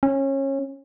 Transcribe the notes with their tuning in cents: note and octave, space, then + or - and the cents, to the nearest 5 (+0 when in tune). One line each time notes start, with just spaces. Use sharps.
C#4 -25